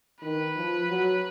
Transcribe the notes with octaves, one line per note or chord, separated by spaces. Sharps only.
D#3 B4
F3
F#3